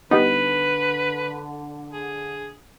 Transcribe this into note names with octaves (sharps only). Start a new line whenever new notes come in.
D3 G3 B3 D#4 B4
G#4